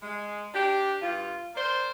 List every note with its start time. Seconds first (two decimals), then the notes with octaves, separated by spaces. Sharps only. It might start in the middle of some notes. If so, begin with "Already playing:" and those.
0.02 G#3
0.54 D4 G4
1.01 G2 F4
1.55 A#3 C5 D5